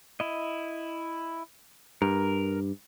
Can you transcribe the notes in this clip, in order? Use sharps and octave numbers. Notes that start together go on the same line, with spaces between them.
E4 D#5
G2 A#4